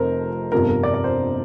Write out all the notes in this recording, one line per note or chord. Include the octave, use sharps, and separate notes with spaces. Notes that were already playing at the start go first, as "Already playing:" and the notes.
Already playing: F1 F2 C3 A#4 C5
G1 F2 C3 F3 A#4
A#4
D5
D5
C5